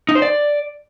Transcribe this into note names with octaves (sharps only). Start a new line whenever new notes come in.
D#4
C5
D5